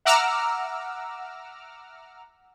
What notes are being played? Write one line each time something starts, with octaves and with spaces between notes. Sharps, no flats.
E5 F#5 A#5 D6 E6 F6